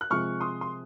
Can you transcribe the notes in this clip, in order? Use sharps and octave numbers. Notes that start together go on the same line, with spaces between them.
F#6
C3 F3 G#3 C#6 F6
C6 D#6
C6